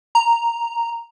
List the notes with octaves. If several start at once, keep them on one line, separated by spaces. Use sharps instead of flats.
A#5